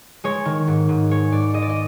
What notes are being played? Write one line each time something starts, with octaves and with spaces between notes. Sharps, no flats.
G#3 C#5
D#3
G#2
G#2
G#3 C#5
G#2 D5
G#3 D#5
D5
D#5